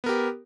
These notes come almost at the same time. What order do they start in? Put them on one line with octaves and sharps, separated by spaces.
B3 A#4 G4